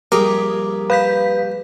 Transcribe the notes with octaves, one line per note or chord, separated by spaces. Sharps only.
A#1 G2 G4 G#4 A#4 A#5 D6 D#6
B4 F5 G6 B6